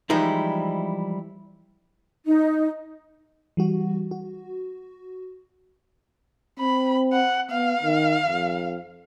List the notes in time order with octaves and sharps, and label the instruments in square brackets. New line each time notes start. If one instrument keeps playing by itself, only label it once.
[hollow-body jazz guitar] E3 F3 G3 G#3 D#4 E4
[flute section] D#4
[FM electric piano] E3 G3 F#4
F#4
[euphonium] C4 [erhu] B5
[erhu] F#5
[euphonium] B3 [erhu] F5
[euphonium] D#3
F2